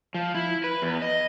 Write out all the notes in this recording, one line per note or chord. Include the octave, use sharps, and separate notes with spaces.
F3
E4
B4
E2
D#5